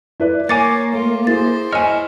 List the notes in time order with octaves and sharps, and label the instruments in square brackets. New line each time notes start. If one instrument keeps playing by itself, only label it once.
[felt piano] E4 B4 D5
[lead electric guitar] A#3 [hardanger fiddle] C#5 [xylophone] G#5 D6 A6 [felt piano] C#7
[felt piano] A3 [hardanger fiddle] F4
[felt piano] E4 G#4 [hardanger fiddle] C5 [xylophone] A6
[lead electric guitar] E4 C#5 [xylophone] D#5 G#5 [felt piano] F6 C#7